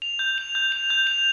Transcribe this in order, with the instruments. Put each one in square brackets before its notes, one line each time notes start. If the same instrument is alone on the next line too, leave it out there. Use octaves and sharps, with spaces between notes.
[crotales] F7
G6
F7
G6
F7
G6
F7